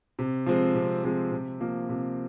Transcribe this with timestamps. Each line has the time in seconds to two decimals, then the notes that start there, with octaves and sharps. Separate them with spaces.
0.19 C3
0.46 F3 G#3 C4
0.75 C3
1.04 F3 G#3 C4
1.31 C3
1.60 F3 A#3
1.89 C3